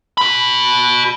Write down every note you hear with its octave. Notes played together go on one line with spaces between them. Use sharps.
F#4 B5